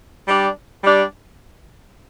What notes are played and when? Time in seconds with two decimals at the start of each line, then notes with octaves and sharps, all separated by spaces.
0.28 G3 D4 G4 D5
0.84 G3 D4 G4 D5